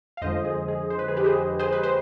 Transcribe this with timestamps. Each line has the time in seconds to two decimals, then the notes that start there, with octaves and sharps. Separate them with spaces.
0.17 F5
0.22 F2 D3 F3 G#3 C5 D#5
0.45 G#4
0.68 G#4
0.90 C5
0.99 B4
1.08 G#4
1.17 G4 B4
1.25 G#4 C5
1.59 G#4 C5
1.73 B4
1.83 C5